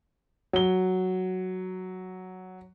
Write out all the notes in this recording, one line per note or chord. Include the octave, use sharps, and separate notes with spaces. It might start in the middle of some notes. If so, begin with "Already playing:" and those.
F#3 G7